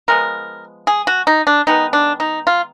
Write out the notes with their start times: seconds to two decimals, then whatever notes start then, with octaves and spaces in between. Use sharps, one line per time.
0.08 F3 G#3 B3 A#4
0.87 G#4
1.07 F#4
1.27 D#4
1.47 D4
1.67 D#3 G#3 B3 D#4
1.93 D4
2.20 D#4
2.47 F4